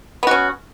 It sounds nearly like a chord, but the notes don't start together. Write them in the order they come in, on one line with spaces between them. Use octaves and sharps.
B3 F#4 C#4